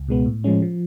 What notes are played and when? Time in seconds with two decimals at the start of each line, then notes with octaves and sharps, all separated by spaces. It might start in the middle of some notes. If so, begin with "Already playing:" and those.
Already playing: C#2
0.08 B2 G#3 B3
0.26 A2
0.44 F3 G#3 C#4
0.62 F3